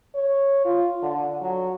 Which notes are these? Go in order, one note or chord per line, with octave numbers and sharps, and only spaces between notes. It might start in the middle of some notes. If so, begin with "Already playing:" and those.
C#5
F4
D3
F#3